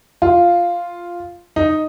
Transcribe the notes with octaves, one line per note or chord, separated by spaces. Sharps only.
F4
D#4